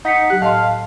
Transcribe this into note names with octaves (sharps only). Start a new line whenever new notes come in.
D#4 F#5 B6 C#7
F#3 G4 F#6
A2 D#5 F5 A5 C6